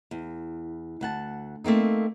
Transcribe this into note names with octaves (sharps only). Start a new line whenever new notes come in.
E2
D2 F#5 A5
A3 A#3 C4 D#4